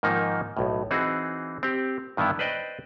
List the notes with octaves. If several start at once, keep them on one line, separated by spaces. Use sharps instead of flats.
G#2 D#3 F3 A#3 D#4
B1 A2
E3 C4 D#4 F#4 G#4
C4 G4
G2 D#3 E3 B3 E4
B4 C5 D5 D#5 G5